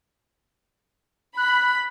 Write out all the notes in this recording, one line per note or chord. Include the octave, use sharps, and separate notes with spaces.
B5 F#6